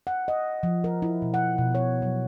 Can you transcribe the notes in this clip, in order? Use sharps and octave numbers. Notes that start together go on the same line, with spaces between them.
F#5
D#5
F3
A#4
E4
B2
F#5
B2
C#5
F#3